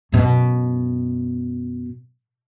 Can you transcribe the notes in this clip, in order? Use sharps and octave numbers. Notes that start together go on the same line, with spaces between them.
F#2 B2